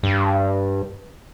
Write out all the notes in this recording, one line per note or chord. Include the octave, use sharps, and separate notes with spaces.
G2